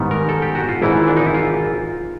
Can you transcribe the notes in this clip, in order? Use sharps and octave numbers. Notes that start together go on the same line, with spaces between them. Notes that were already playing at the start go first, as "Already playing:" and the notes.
Already playing: G#2 D#3 G3 B3
A#4
A4
G4
F#4
F4
G#1 G#2 E3 E4
D4
D#4
E4
F4